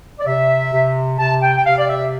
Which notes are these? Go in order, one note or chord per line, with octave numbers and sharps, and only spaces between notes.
D5
C3 E5
C3
C3 A5
G5
G5
C3 F5
D5
E5